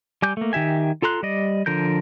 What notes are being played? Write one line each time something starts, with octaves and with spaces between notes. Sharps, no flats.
G3 G#5 D6 G6
A3 A#3
D#3 G4 E5 G#5
F4 A4 A#5 C6 F#6
G3 D5 D#5
D3 F3 A#4 G6